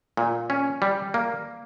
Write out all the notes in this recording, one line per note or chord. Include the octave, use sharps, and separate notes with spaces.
A#2
C#4
G3
A#3